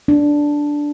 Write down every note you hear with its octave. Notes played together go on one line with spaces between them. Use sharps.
D4